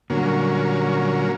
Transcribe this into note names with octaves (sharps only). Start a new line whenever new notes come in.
A#2 D3 F#3 G3 A#3 C#4